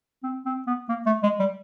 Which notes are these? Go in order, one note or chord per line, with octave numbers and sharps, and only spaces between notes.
C4
C4
B3
A#3
A3
G#3
G3